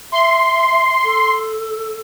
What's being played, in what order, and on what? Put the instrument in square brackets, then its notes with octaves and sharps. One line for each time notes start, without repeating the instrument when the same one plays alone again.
[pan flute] E5 [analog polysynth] C6
[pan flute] A4